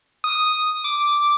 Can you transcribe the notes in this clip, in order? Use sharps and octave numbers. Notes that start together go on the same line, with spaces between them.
D#6
D6